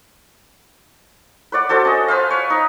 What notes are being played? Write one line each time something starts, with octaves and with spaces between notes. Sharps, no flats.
B4 C#5 D5 F#5
D4 F#4 A4 C5
C#4 D#5
B4 C5 F5
C#5
D#4